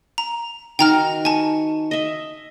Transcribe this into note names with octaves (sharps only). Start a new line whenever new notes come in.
A#5
D#3 F#4 G5 A#5 D6 F6
G#5 A5 C#6
D#5 E5